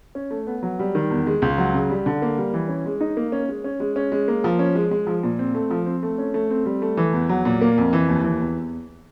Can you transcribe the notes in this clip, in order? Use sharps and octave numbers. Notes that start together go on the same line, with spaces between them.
C#4
A3
B3
F#3
G3
D#3
E2
G#3
C#2
F#3
C#3
G3
D3
A#3
G3
E3
C#4
G#3
D#4
A#3
C#4
G#3
C#4
G#3
C#4
G#3
A#3
F3
C#4
G#3
G#3
F3
A#2
C4
A3
F3
C4
A3
C#4
A3
C4
G3
A3
E3
E2
F#3
A#2
A#3
F2
E3
D#2
E3
E2